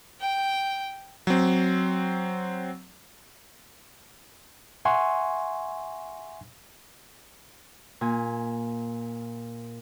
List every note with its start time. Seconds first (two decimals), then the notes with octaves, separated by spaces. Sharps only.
0.21 G5
1.27 F#3 C4
4.85 E5 F#5 G#5 C6 C#6
8.01 A#2 G#5